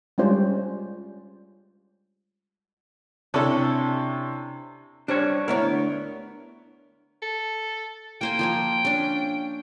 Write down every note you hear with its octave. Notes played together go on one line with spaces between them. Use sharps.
G3 G#3 C#4 F4 C5 D5
C3 C#4 D4 E4 A4
G3 D4 C5 C#5
D2 B3 E4 A#4 C#5
A4
A#3 C5 G5 G#5
F3 A#3 G#5
C#4 D4